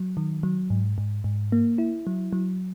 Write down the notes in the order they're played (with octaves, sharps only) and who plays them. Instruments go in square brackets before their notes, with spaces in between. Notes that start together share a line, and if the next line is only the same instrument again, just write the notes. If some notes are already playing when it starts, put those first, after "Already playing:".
Already playing: [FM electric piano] F#3
D#3
F#3
G#2
G#2
G#2
A#3
E4
F#3
F#3